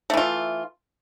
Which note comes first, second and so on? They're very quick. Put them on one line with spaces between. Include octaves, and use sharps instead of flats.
A3 E3 F4